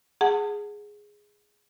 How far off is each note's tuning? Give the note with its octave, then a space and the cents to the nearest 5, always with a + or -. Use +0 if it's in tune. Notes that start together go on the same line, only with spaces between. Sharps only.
G#4 +0 F#5 +0 A5 +35